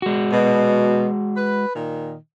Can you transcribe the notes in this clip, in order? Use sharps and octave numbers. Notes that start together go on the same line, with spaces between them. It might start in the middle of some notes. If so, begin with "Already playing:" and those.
G#3 F#4
B2
B4
A#2 D#3